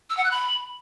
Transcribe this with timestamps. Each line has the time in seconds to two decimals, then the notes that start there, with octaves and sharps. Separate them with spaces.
0.10 E6
0.17 F#5
0.24 F#6
0.31 B5